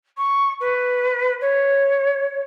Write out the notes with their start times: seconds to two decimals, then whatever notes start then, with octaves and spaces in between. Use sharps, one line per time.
0.17 C#6
0.60 B4
1.41 C#5